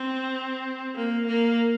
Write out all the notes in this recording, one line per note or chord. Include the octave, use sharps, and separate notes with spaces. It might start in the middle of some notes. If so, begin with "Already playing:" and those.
Already playing: C4
A#3
A#3